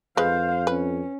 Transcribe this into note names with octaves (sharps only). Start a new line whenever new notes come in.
F2 G#3 B4 C5 F5
C#4 B4